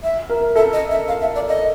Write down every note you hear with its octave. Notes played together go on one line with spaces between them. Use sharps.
E5
A#4
A4 E5
D#5
E5
F5
E5
D5
D#5